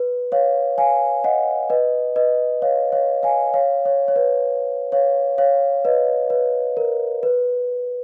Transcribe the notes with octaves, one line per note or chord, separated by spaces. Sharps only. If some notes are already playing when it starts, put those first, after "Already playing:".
Already playing: B4
C#5 F5
F5 G#5
D#5 F#5
B4 D#5
B4 D#5
C#5 F5
C#5 F5
F5 G#5
C#5 F5
C#5
C#5
B4
C#5 F5
C#5 F5
B4 D#5
B4
A#4
B4